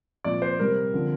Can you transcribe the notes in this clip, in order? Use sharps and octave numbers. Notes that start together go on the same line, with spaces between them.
A#2 F3 C4 D5
C5
C3 G3 C4 A#4
D3 F3 C4